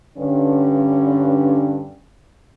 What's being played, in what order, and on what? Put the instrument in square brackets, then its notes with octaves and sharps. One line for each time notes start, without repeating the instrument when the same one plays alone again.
[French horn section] G2 D3 C#4